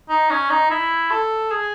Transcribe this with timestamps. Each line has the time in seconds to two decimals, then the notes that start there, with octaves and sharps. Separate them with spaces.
0.09 D#4
0.30 C#4
0.50 D#4
0.70 E4
1.11 A4
1.51 G#4